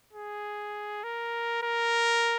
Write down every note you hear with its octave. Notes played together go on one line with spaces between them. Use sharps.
G#4
A#4
A#4